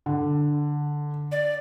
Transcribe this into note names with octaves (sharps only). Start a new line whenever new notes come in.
D3
D5